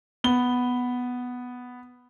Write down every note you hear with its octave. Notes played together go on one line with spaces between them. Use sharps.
B3 G7